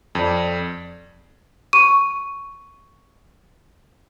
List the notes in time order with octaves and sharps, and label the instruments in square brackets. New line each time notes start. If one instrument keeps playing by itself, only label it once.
[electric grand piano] F2 D5
[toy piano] C#6 [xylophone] D#7